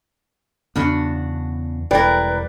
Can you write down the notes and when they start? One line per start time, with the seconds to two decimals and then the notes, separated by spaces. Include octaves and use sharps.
0.76 E2 G2 C#3 B3 D4 F#4
1.91 E1 E3 G3 A#4 B4